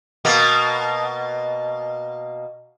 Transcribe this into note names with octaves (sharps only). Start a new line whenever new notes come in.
B2 A#3